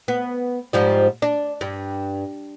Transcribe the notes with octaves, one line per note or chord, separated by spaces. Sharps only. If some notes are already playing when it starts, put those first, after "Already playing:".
B3
G#2 F3 G3
D4
G2